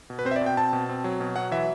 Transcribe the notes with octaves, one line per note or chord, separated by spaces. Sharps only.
B2
B4
C4 C5
E5
D5
B2
G5
C4 A5
B2
C4
F#3
B2
F#3 F#5
E3 E5